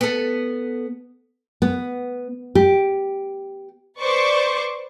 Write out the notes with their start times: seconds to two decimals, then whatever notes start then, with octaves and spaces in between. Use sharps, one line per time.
0.01 B3 A4
1.62 B3
2.55 G4
3.99 B4 C5 D5 C#6 D6